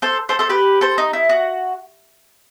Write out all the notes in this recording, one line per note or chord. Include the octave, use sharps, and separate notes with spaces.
A4 C5
A4 C5
A4 C5
G4 B4
A4 C5
D#4
E4
F#4